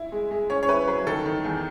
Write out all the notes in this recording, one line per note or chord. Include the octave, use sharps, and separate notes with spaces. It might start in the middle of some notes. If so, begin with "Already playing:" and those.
Already playing: E4
G#3
G#3
C#4 C#5
C#5
E4 B4
F#3 B4
D#3 A4
D#3
E2